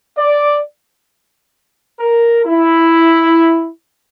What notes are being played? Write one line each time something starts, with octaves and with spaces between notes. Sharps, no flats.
D5
A#4
E4